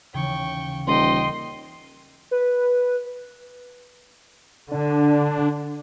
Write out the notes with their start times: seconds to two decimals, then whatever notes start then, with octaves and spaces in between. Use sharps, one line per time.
0.14 D#2 C#3 E3 G5 C#6
0.87 D#1 D#5 G5 C6
2.31 B4
4.71 D3 D4